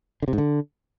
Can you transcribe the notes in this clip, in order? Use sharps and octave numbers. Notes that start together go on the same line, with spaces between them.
D3
C3
G#2
D3